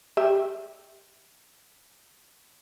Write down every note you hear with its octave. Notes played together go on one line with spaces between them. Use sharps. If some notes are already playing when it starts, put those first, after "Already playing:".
G4 E5